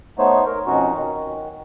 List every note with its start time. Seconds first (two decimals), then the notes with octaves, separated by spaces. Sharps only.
0.18 A3 B3 D#4 C5 C#5
0.46 A#4
0.66 F2 B2 C#4 D#4 F#4
0.93 D#3